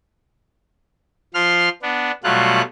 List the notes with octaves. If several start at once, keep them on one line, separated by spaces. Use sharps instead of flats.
F3 C6 F6
B3 D4
B2 F#3 G3 A3 F4 F#6